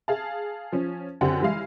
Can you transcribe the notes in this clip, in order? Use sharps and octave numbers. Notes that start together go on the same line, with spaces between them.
G#4 F5 A5
F3 C#4
F#2 D3 C4 G4 F#5
E3 G3 G#3 F5